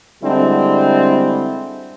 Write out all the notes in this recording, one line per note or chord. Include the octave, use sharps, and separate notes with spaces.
D3 G3 G#3 C4 D4 E4